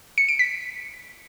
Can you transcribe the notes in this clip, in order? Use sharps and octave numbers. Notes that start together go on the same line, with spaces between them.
C#7
D7
B6